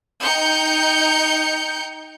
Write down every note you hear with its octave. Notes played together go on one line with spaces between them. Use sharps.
D#4 G5 G6 C#7